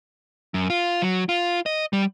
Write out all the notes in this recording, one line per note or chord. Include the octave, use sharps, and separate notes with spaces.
F#2
F4
F#3
F4
D#5
G3